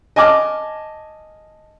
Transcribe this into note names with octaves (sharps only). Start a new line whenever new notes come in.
D#5 G#5 A5 D6 F6